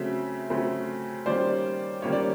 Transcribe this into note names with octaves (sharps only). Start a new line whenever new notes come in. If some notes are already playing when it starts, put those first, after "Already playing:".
Already playing: C#3 F#3 A3 C4 E5
C#3 F#3 A3 C4
D#3 G3 A#3 C#4 C5 D5
D#3 G3 A#3 C#4 C#5
D5